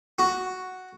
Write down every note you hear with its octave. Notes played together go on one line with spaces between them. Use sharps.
F#4